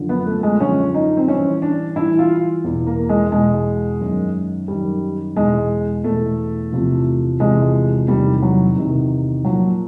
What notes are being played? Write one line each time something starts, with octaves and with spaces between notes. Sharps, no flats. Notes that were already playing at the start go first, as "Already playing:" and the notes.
Already playing: F#2 D3 F3
B3
A3
G#3
F#2 D3 F3 C#4
D#4
C4
G2 E3 C#4
D4
G2 E3 E4
F4
E2 B2
A#3
G#3
E2 B2 G#3
F#2 D#3
F#2 D#3 G3
E2 B2 G#3
E2 B2 A3
E2 C3 F3
E2 C3 F3 G#3
E2 C3 D#3 G3
F#3
E2 C3 D#3
A#2 F3 F#3